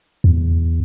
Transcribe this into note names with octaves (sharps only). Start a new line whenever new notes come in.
E2